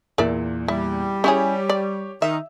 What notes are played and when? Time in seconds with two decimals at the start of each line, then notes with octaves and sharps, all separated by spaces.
0.18 E2 A#2 A#4 D5 E5
0.68 G3 E4
1.24 C#4 E4 G4 G#4 C#5
1.69 D5
2.22 D#3 D#4 E5